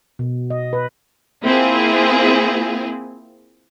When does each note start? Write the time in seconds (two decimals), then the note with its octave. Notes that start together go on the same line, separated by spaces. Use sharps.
0.19 B2
0.50 D#5
0.73 B4
1.44 A#3 C4 E4 F4 G#4